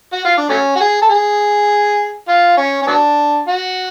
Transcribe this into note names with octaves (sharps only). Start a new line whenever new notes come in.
F#4
F4
D4
F#3 A3 C#4
F#4
G#4
A4
G#4
F4
C#4
C#4
F#3 B3 D4
F#4